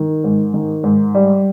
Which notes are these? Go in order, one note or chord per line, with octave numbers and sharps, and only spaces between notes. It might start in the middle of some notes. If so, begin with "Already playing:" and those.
Already playing: D#3
G#2
D#3
G#2
G3